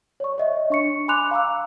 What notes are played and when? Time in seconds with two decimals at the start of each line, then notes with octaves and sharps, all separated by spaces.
0.20 C#5 D5 C#6
0.38 C#5 D#5 E5
0.70 D4 C#6 C#7
1.08 G#5 B5 C6 D6 F#6 F7
1.31 F5 A#5 D6 E6